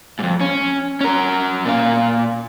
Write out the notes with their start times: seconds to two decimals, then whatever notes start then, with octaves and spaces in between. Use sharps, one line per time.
0.19 F2 G#2
0.41 C#4
1.01 C#4 A#4
1.66 A#2 F5